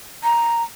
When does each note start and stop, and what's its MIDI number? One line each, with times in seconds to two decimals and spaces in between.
0.24 0.63 82